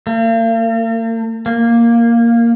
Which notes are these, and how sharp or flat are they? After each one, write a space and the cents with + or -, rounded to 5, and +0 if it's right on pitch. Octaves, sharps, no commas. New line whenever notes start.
A#3 -45
A#3 +0